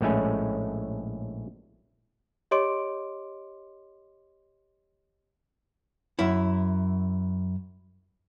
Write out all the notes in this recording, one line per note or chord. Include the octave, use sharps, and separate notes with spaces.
A#1 A2 G#3 A3 C#4 G#5
G4 C#5 D#5 C6 D6 D7
F#2 E4